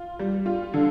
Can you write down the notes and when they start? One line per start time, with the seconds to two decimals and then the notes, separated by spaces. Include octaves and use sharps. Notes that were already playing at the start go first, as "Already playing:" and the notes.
Already playing: F4
0.19 G3
0.46 F4
0.74 D3